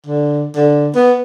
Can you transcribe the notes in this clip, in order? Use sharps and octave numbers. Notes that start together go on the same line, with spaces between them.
D3
D3
B3